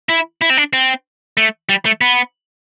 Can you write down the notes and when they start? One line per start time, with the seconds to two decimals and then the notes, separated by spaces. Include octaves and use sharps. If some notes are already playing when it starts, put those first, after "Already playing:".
0.09 E4
0.41 E4
0.50 C4
0.57 D4
0.73 C4
1.37 A3
1.69 G3
1.85 A3
2.01 B3